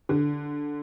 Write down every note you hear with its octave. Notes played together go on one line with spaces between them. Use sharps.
D3